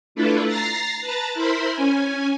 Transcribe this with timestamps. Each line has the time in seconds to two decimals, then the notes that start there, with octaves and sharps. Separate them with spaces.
0.15 A3 D4 E4 F4 A4 B4
0.45 A#5 A6 A#6 C7
1.01 B4 A5 A#5 A6
1.34 E4 A#4 C5 B5 C6
1.75 C#4 G#5